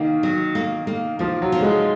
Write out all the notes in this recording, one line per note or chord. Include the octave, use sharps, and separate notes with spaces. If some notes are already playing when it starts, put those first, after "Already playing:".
Already playing: D#3 A#3
F#3
A#3
A#3
F3 A#3
F#3
F3
G#3